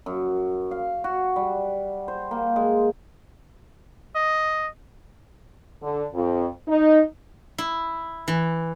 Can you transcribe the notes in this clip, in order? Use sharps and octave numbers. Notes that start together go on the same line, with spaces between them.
F#2
F5
F#4
G3
C5
A#3
G#3
D#5
D3
F2
D#4
E4
E3